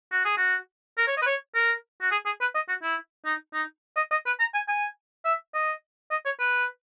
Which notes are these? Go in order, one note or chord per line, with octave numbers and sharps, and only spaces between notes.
F#4
G#4
F#4
A#4
C#5
D#5
B4
C#5
A#4
F#4
G#4
G#4
B4
D#5
F#4
E4
D#4
D#4
D#5
D#5
B4
A#5
G#5
G#5
E5
D#5
D#5
C#5
B4